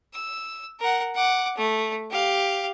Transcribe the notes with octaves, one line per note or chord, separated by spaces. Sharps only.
E6
A#4 F#5
F#5 D6
A3
G4 F5